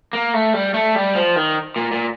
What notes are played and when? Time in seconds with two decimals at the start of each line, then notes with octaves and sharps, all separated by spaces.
0.13 A#3
0.34 A3
0.54 G3
0.74 A3
0.95 G3
1.15 F3
1.36 D#3
1.76 A#2
1.92 A#2